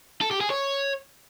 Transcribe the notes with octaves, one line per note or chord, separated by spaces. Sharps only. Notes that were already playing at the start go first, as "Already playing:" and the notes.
A4
G4
G#4
C#5